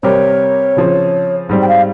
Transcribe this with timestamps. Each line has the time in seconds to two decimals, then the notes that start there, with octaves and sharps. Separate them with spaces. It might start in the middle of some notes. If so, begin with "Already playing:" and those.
0.03 C3 G3 C4 G4 A#4 C#5
0.77 C#3 F3 C4
1.49 G#2 G3 C4 G4
1.62 G5
1.68 F5